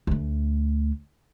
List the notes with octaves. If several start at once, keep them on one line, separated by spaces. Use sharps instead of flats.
D2 A3